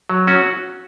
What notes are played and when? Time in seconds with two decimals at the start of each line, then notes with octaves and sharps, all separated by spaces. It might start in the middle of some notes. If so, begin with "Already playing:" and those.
0.09 F#3
0.27 C#4 F#4